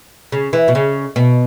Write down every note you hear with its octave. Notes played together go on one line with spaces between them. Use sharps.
C#3
E3
B2
C#3
B2